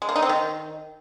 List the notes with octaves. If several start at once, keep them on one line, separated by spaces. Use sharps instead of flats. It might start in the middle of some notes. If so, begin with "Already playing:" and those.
G#3
A#3
D#4
C4
D#3